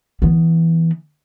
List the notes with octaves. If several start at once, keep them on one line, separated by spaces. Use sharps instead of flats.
E3 B3